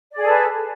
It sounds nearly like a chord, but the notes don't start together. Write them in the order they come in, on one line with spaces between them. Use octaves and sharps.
D5 G#4 A4 B4